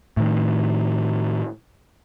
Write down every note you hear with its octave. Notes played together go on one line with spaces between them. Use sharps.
A2 D#3